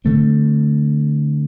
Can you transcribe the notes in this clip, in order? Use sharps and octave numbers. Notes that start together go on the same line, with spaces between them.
D3 A3 C4